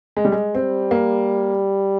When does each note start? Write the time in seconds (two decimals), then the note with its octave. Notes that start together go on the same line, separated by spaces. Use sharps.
0.17 G#3
0.25 G3
0.32 G#3
0.55 G3 C4
0.91 A#3